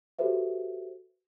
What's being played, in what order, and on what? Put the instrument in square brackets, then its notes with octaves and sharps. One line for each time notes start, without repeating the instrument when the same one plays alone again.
[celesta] F#4 G4 A4 B4 C5 E5